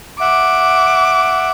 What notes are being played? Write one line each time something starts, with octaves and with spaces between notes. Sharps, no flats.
E5 F#5 D6